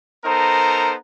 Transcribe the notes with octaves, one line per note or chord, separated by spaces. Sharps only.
B3 D#4 A4 A#4 C5 A#5